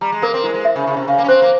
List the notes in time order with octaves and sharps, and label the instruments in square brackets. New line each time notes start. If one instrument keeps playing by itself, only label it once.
[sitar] G3 [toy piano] A#5
[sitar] G#3
[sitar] A#3 [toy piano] A#4
[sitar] C4
[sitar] G#3 [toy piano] E4
[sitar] G#3
[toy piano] E5
[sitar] C#3
[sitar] C#3 [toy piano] C#6
[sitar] C3
[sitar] C#3 [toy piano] F5
[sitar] A#3
C#4
[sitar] C4 [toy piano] C5
[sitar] A#3